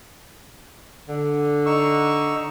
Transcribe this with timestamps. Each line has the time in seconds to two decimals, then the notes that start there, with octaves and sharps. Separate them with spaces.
1.08 D3
1.66 D#4 C#6 E6